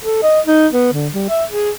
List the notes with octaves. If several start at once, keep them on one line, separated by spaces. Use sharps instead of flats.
A4
D#5
D#4
B3
D3
G3
E5
G#4